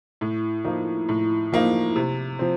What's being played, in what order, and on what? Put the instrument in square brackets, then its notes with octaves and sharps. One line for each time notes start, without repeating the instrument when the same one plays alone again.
[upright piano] A2
F3 A#3 D#4
A2
F3 A#3 D#4
C3
F3 C4